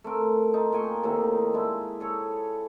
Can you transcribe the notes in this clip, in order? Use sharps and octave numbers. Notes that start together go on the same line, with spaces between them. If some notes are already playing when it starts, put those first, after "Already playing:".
A3 C4 A#4
D#4 F4
A#2 G5 G#5 C#6
A2 C3 D#3 A#3
G#3 D4 E4
G#4 A4 C#5